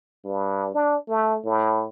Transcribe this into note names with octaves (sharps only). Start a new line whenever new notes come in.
G2
D4
A3
A2